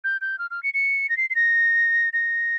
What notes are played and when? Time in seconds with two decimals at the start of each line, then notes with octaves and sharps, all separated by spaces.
0.04 G6
0.21 G6
0.39 F6
0.51 F6
0.63 C#7
0.74 C#7
1.09 A#6
1.17 C7
1.30 C7
1.35 A#6
2.13 A#6